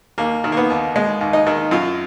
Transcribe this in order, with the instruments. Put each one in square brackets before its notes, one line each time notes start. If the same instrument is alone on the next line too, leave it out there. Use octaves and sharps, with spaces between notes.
[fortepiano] D#2 A#3
D#3
A#3
B3
D#2
G#3
D#2
D#4
D#3
F#2 F4